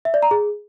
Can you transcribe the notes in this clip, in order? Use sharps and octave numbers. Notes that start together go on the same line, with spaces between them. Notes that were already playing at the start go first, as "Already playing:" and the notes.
E5
D5
A#5
G#4